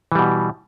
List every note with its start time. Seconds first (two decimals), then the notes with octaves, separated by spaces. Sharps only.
0.12 E3
0.15 G3
0.19 B2